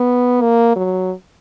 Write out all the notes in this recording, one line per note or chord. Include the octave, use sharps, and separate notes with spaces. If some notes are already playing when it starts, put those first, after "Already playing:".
Already playing: B3
A#3
F#3